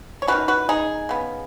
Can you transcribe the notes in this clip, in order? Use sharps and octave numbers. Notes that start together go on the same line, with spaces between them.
C#5
D#3 F#3 C#4 F#4 B4
F#4 B4
D#4 G#4
C#3 B3